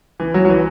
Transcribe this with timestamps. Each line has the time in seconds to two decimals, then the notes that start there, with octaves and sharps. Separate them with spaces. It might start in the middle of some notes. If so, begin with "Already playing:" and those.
0.20 E3
0.34 F#3
0.45 F#3
0.49 E3